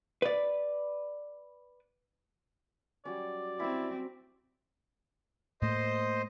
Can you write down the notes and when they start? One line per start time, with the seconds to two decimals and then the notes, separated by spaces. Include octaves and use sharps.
0.22 B4 D5
3.05 F#3 G3 C#4 D5
3.60 C4 E4 B5 E6
5.62 A2 A3 A#3 C5 D#5